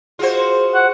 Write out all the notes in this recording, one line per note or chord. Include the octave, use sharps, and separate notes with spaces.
F4 F#4 G#4 C5
F#5